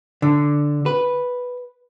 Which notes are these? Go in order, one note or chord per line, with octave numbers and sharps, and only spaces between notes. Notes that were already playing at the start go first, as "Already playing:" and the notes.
D3
B4